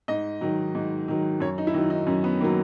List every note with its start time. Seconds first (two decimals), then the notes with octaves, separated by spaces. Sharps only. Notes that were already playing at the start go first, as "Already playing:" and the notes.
0.08 G#2 D#5
0.41 D#3 F#3
0.75 G#2
1.08 D#3 F#3
1.40 F#2 C#5
1.58 D#4
1.67 E4
1.74 D#3 F#3 D#4
1.90 D#4
2.07 F#2 C#4
2.24 B3
2.40 D#3 A#3
2.44 F#3